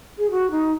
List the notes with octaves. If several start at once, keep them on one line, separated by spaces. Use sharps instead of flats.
G#4
F#4
D#4